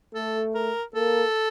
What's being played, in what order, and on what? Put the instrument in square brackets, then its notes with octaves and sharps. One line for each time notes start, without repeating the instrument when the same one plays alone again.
[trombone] A3 [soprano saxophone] A4
[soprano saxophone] A#4
[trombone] A#3 [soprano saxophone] A4